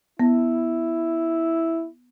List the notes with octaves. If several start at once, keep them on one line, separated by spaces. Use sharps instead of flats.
B3 E4